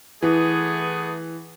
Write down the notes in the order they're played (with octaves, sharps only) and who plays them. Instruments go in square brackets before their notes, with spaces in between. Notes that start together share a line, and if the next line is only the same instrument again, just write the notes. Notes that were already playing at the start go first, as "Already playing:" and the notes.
[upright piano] E3 [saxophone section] A3 B3 G#4